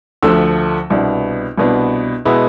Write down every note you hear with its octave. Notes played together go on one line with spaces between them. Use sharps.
D2 D3 F3 A3 E6
C2 B2 B3 D4
C2 B2 B3 D4
B2 G#3 B3 E4